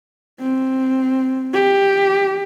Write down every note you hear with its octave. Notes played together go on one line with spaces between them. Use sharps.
C4
G4